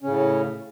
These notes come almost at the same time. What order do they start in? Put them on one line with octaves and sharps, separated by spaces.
C#4 C#3 A2